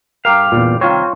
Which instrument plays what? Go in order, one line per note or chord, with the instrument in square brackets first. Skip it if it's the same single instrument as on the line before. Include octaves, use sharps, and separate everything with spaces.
[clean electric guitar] G2 G4 F5 [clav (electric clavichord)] A#4
[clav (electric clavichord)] E2 A#2
[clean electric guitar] C2 D#3 C4 [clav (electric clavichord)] F4 C#5